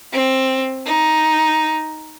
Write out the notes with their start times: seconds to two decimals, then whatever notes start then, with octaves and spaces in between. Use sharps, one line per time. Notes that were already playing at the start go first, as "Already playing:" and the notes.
0.13 C4
0.86 D#4